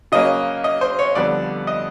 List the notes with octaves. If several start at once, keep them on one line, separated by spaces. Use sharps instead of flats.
C#3 F#3 A#3 C#4 D#5
D#5
C5
C#5
F2 D3 G3 B3 D5
D#5